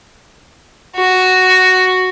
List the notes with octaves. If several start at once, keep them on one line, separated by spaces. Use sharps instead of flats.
F#4